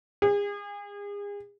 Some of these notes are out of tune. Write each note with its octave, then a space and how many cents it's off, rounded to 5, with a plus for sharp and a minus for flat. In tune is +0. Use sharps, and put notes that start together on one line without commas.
G#4 -35